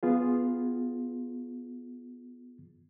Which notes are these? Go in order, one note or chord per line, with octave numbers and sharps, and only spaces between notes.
B3 F4 G#4